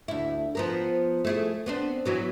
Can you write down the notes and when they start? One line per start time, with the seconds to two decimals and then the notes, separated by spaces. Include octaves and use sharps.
0.08 D2 E4
0.55 F3 B3 A#4
1.25 A3 E4 G#4
1.66 B3 C4 D4
2.05 E3 F#3 B3